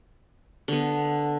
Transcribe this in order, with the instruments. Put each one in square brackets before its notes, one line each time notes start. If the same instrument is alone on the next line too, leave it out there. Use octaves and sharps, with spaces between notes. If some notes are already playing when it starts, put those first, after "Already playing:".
[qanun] D3 B3